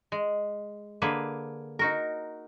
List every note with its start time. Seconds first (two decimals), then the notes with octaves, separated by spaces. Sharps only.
0.12 G#3
1.02 D3 A#3 G#4 B4
1.79 D#4 F#4 A#4